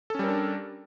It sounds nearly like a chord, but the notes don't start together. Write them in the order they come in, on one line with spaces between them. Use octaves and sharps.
A4 C#4 G3 A#4 D4